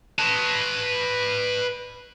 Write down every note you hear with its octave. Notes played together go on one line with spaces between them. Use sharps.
B4 A5